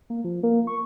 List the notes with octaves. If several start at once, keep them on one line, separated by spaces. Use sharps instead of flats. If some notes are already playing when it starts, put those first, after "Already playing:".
A#3
F3
A#3
C#6